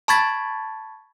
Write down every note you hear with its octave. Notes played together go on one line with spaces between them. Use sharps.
A5 B5 C#6 G#6 A6 B6